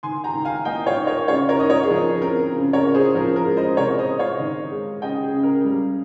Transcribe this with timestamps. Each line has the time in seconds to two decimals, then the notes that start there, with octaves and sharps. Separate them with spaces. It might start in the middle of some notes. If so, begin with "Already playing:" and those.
0.03 D#3 G#5 C6
0.24 G5 A#5
0.34 D#3
0.45 F5 G#5
0.65 A#3 D#5 G5
0.86 C#5 F5
0.97 D#4
1.07 A#4 C#5
1.28 C#3 C#5 F5
1.49 A#4 C#5
1.59 D#4 D#5
1.69 A#4 C#5
1.83 G#4
1.91 F3 A#4
2.21 C4 A#4
2.53 C#3
2.73 A#4 C#5
2.84 C#3
2.94 G#4 C5
3.15 F3 A#4
3.36 A#4
3.46 G#3
3.57 C5 D#5
3.77 C3 A#4 C#5
3.98 C5 D#5
4.09 C3
4.19 C#5 F5
4.40 D#3
4.71 G#3
5.02 C#3 D#5 G5
5.23 G#4
5.33 C#3
5.43 A#4
5.64 G3